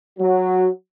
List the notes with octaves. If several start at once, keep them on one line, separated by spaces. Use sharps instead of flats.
F#3